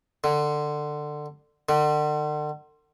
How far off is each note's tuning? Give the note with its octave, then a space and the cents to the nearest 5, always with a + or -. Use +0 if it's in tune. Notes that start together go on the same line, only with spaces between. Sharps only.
D3 +20
D3 +40